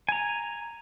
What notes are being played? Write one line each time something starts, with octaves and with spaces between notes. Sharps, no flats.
G#5 A#5